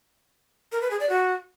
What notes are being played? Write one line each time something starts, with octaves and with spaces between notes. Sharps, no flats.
A#4
B4
G#4
D5
F#4